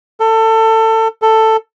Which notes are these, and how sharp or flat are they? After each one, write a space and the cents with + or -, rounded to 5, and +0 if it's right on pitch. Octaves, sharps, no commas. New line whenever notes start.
A4 +25
A4 +10